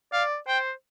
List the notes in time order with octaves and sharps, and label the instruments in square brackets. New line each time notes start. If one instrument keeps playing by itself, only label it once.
[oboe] D5 [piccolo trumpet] F5
[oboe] C5 [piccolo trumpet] G5